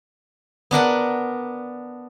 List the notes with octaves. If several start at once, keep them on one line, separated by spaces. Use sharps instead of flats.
B3 D4 A#4 F#5